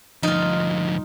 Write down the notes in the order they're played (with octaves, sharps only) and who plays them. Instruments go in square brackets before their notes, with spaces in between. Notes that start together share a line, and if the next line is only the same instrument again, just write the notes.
[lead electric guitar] D2 F3 [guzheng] D#4 F4